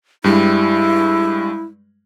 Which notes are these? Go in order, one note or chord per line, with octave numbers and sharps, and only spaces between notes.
G2 G3 G#3 E4